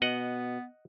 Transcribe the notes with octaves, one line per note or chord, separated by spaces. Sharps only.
B2 B3 D#5 F#5